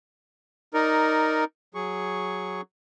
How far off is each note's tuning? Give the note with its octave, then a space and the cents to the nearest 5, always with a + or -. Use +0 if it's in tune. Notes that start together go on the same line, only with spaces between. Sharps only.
D#4 +5 A#4 +0 D5 -10
F#3 +0 G#4 +0 C#6 +0